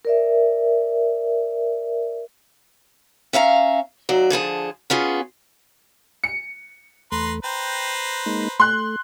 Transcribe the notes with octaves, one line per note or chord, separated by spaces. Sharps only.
A#4 D5 E5
C#4 E5 F5 A#5
D#2 F#3 D5
D3 F3 G#4 A5
B3 C#4 F4 G#4
C#7
E2 A3 B4 A#5 C6
B4 C5 G5 A#5
G#3 A#3 D#4
A3 C6 F#6